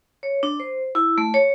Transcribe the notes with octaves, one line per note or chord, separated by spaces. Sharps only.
C#5
D4
C5
E4
A3
C#5